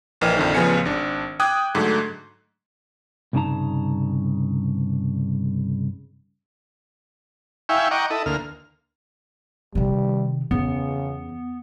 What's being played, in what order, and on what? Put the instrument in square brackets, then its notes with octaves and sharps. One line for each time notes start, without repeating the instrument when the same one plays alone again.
[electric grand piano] A#1 E3 A#4 D#5 G5 F6
A#1 F2 D3 D#3
A1 C#3 F3 B3 G#5 C#7
G#1 D4
G5 D6 D#6 F#6 G#6
G#2 D3 F#3 A3
[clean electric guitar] C2 G2 C#3 D#4 A5 A#5
[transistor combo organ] E4 E5 F5 G5 G#5 C#6
D#5 F#5 G5 A#5 C#6 D6
E4 A4 D#5
D2 A#3 F6
[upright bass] C3 D#3 [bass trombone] G3
[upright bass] E2 [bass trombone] C#3 [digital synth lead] B3